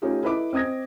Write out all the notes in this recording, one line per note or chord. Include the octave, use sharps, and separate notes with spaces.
A3 C#4 D#4 F4 G4 G#4
E4 A4 B4 D#5 B5 D6
C4 D#5 D#6 G#6 A#6